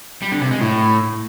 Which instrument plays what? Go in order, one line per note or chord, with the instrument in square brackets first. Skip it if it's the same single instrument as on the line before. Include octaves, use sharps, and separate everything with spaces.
[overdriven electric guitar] G3
D3
C3
G#3
A2